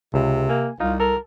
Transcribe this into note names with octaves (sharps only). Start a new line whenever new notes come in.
C#2 C3
A#3 G#5
C2 D#4 F4
A4 A#4